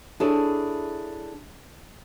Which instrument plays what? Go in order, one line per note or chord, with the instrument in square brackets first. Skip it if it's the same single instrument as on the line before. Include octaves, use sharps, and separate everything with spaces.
[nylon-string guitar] D4 E4 G#4 A4 C#5